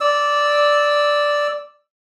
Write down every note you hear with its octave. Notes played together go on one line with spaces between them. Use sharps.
D5 E6